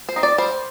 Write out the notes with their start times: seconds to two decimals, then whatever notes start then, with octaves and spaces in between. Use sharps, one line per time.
0.09 C5
0.16 C4 D#4
0.23 D5
0.38 G3 C5